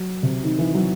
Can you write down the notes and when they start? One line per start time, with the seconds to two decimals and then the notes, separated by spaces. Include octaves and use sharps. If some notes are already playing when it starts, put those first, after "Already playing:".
Already playing: F#3
0.23 C3
0.43 D#3
0.59 E3
0.75 F#3